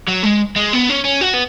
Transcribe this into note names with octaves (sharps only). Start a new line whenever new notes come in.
F#3
G#3
G#3
B3
C#4
C#4
F#4
B3